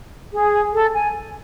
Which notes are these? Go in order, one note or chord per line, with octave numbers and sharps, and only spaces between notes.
G#4
A4
G#5